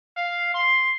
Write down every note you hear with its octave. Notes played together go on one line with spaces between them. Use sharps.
F5
C6